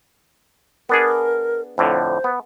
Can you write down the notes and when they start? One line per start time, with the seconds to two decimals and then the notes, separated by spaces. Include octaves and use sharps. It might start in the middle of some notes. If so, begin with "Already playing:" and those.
0.89 B3 D4 G#4 A#4
1.78 F2 A2 D3 C5
2.24 B3